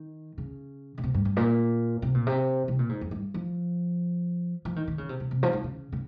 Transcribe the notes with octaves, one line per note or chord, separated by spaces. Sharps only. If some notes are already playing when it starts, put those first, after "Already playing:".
Already playing: D#3
C#3
C#3
C3
G2
G2
A#2
C3
A#2
C3
C3
A#2
G#2
F2
G2
F3
F3
D#3
D#3
C#3
C3
C3
C3
F3
D#3
C#3
C#3